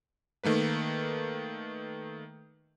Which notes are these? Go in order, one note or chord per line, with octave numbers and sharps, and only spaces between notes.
D#3 A3 A#3 B4